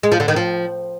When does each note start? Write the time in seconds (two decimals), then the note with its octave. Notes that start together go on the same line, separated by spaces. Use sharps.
0.03 G#3
0.12 F3
0.20 D3
0.28 D#3
0.36 F3